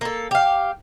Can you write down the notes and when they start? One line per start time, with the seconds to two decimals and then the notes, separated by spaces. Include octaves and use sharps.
0.01 A#3 A4
0.31 G4 F5